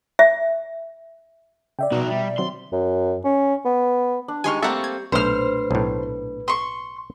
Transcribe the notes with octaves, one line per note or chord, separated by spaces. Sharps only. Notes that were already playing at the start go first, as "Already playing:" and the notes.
E5
C#3 D5 E5 G5
B2 D#4 F#4
G3
D#3 F#3 C4 C6
F#2
C#4
B3
D4
D#3 G3 G#3 D#4 G#5 C6 C#6 F6
A3 A#3 C4 A4 E5 F#5
G#6
B1 A#2 A3 D4 B4 C5 F6
B1 A2
C6 C#6